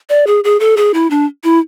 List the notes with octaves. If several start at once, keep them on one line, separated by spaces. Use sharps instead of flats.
D5
G#4
G#4
A4
G#4
E4
D4
E4